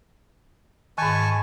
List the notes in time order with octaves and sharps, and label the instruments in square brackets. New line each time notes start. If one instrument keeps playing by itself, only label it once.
[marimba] G#2 D#3 [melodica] G#5 A5 C#6